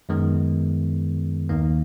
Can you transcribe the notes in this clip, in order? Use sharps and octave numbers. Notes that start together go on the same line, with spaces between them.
F#2 D#3 G#3 B3
D#2 D#3 A#3